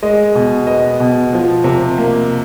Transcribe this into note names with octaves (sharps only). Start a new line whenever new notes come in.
G#3 D#5
B2
B3 D#5
B2
F3
C3
A#3